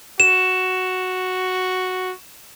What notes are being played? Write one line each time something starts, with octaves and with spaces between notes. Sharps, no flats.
F#4 E7